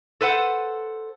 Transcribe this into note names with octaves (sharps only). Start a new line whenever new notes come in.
A4 B4 C5 F#5